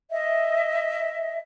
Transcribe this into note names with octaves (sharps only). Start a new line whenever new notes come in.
D#5 E5